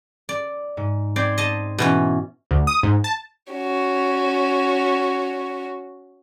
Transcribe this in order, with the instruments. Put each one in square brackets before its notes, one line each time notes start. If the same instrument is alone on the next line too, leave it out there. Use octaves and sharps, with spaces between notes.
[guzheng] D5
[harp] G#2
[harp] C4 C5 G#6 [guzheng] D5
[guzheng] D#5 A5
B2 E3 C#4
[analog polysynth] D2
D#6
G#2
A5
[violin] C#4 F#4